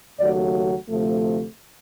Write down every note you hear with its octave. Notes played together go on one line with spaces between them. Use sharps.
D#2 C#3 F#3 A3 D5
D2 C3 F3 A3